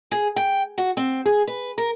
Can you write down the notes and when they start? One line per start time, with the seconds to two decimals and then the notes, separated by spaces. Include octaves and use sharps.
0.11 G#4
0.36 G5
0.78 F#4
0.97 C4
1.26 G#4
1.47 B4
1.78 A#4